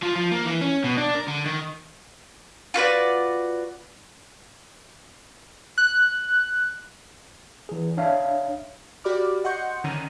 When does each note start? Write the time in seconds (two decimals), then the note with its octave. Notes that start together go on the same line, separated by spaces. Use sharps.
0.02 F3
0.15 F3
0.31 A#3
0.45 E3
0.61 C#4
0.84 B2
0.97 D4
1.15 A#4
1.28 D3
1.46 D#3
2.74 F4 F#4 B4 D5
5.78 F#6
7.69 E3 G#4
7.97 D4 C#5 E5 F5
9.04 F#4 G4 D5 B5 D6 F6
9.44 D#5 F#5 C6 C#6 G6 C#7
9.84 D3 D#3 C#4 A#5 D#7